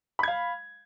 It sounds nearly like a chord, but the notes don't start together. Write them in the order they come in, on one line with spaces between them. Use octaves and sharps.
B5 G#6 F5